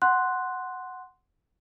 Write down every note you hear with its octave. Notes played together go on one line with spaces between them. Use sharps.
F#5 C6 F#6